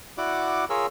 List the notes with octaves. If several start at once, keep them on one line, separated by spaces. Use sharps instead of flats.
E4 F#4 D5 F#5 D6
F4 G#4 A#4 C#5 E6